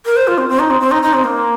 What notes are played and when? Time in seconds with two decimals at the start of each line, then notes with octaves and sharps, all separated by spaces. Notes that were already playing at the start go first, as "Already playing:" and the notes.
0.06 A#4
0.16 C5
0.27 F4
0.38 C4
0.49 C4
0.59 D#4
0.70 C4
0.80 C4
0.91 D#4
1.03 D#4
1.13 C4
1.24 A#3